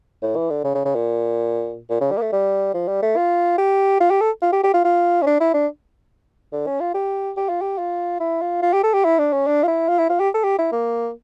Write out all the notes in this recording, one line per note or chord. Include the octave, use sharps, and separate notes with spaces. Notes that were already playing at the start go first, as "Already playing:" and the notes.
A2
E3
D3
C#3
C#3
C#3
A#2
A#2
C#3
G3
A#3
A3
G3
F3
G3
A3
F4
G4
F4
G4
A4
F4
G4
G4
F4
F4
C#4
D4
E4
D4
D3
C#4
F4
G4
G4
F4
G4
F4
E4
F4
F4
G4
A4
G4
E4
D4
C#4
D4
F4
E4
F4
E4
F4
G4
A4
G4
E4
A#3